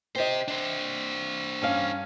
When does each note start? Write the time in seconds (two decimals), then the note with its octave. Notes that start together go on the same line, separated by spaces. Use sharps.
0.16 C4 G4 C5 D#5
0.48 D4 C5
1.62 G2 C#4 F5